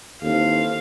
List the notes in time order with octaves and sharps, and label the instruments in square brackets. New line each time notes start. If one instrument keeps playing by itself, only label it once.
[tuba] D#2 [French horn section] E3 C4 A4 [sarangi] F5